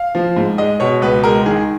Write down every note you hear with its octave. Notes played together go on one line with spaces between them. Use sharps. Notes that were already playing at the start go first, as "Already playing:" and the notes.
Already playing: F5
F3
G#2
G#3 D#5
B2 C#5
C#2 B4
G#3 A#4
D#3 G#4